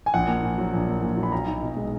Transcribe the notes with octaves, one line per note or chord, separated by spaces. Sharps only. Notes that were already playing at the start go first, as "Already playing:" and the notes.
G#5
A#1 F#5
A#3
A#2
F#3
A#1
A#3
A#2
F#3
B5
B1 A#5
D#4
B2
G#3